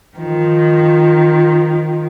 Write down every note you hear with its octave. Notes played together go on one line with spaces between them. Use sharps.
D#3 F3